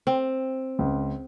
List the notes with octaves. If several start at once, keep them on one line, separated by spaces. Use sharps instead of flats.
C4
C#2